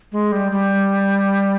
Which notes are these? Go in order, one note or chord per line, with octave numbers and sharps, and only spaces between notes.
G#3
G3
G3